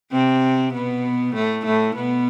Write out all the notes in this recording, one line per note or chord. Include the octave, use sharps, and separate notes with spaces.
C3 C4
B2 B3
A2 A3
A2 A3
B2 B3